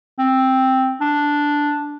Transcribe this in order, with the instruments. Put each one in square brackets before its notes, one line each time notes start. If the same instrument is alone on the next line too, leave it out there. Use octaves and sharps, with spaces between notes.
[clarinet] C4
D4